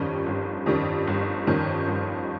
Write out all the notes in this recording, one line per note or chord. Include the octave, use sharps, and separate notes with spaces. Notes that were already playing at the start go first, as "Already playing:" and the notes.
Already playing: G1 F2 D#3 G3 C#4
G1
F2 D#3 G3 C#4
G1
F2 D#3 G3 C#4
G1